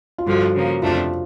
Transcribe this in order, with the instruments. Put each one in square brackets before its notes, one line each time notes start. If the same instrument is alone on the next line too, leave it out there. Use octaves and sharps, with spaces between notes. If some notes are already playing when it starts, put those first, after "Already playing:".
[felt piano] F4
[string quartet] G2 D3 F3 [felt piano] F#4
[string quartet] C#3 F3 A#3
[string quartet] F2 C3 F3 A3 D4 [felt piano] F4